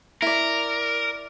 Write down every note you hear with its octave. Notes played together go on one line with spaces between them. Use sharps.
E4 A#4 D5